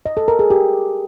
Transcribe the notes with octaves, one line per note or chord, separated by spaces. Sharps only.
D#5
A4
A#4
G#4
G4